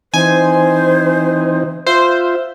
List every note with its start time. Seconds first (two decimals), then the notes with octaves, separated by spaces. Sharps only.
0.14 E3 C4 D#4 C5 G#5
1.87 F4 C5 E5